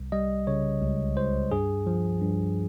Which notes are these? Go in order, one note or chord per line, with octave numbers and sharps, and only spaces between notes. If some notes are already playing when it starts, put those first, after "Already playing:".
Already playing: C2
G3 D#5
C#3 C#5
C#2
C#2 C5
G2 G#4
F3
G2